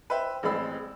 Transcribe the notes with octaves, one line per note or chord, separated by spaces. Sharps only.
B4 C5 E5 G5
A1 G#3 C4 D5 B5 E6